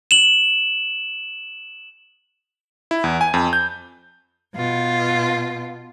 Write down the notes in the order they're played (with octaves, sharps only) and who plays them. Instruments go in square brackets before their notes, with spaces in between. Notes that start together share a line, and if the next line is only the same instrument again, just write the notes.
[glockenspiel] E7 F#7
[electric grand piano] E4
E2
G#5
F2
G6
[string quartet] B2 F4